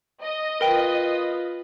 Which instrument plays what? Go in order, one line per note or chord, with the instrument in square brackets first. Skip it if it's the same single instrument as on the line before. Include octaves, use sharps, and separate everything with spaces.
[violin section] D#5
[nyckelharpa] F4 B4 [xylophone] A#4 G5